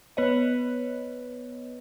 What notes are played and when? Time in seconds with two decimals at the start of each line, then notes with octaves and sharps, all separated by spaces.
0.17 B3 B4 C#5 D#5